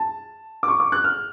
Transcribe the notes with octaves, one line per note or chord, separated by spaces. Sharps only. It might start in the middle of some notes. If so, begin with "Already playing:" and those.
Already playing: A5
D6
C#6
D6
F#6
F6